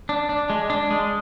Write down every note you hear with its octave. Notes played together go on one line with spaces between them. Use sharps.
D4
D4
G#3
D4
G#3